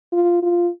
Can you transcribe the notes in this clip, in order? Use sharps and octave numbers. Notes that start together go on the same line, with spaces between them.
F4
F4